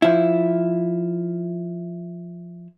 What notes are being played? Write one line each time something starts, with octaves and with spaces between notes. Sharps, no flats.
F3 E4